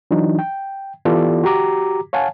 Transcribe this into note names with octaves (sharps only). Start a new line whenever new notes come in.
E3 F#3 D4 D#4
G5
E3 B3 F4 G4 A4 D5
F#4 G4 A#5 D6
C#5 F5 F#5 G#5 A5